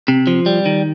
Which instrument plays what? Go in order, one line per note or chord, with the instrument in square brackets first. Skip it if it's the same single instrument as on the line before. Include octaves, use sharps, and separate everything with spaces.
[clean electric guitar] C3
F3
G3
D#3